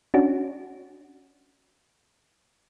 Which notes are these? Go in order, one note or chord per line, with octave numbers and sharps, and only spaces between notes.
C#4 D4 F#4